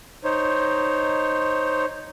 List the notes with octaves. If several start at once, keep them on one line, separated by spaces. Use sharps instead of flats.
D#4 C5 C#5